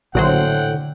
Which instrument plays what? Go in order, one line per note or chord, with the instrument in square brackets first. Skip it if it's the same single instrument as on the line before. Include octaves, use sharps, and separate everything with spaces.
[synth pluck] A#1 F#3 C5 [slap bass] A2 [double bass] D3 [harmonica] F#5 G5